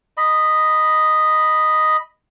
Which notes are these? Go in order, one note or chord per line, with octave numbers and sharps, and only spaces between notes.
D#5 B5